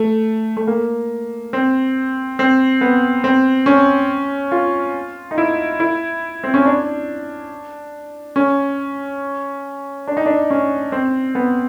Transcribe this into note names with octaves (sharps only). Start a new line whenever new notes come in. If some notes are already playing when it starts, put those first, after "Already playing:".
Already playing: A3
A3
A#3
C4
C4
B3
C4
C#4
F4
D#4
E4
E4
C4
C#4
D4
C#4
D4
D#4
D4
C#4
C4
B3